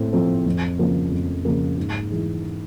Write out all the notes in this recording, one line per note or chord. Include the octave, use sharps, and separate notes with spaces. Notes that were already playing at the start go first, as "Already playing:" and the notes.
Already playing: A2 A3 C4
F3 A3 C4
F2
C#3 F3 A#3
F2
C#3 F3 A#3
G#2
E3 G#3